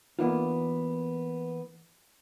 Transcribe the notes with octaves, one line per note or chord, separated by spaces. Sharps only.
E3 A#3 B3 D4 D#4 F4